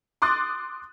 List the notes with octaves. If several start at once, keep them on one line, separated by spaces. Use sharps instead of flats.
C6 D6 D#6 F#6 A6